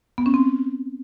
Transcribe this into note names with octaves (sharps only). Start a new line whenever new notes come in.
B3
C#4
C4